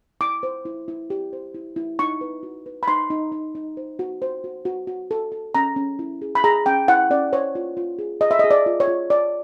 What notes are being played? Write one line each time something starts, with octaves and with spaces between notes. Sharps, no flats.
E4 D6
C5
E4
E4
G4
C5
E4
E4
D#4 C#6
B4
F#4
B4
B5
D#4 C6
D#4
D#4
D#4
C5
F#4
C5
F#4
F#4
F#4
A4
A4
C#4 A#5
C#4
E4
G#4
B5
G#4 A#5
C#4 G5
E4 F#5
C#4 D5
C5 C#5
F4
F4
G#4
G#4 D#5
E5
D#5
G#4
D5
F4
C#5
F4
F4 D5